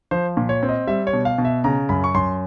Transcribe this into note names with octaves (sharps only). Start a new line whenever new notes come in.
F3 C5
A#2
C#5
C4
D#5
G3 E5
C#5
B2
F5
B2
E5
C#3 A#5
F#2 B5
C#6
F#2 C6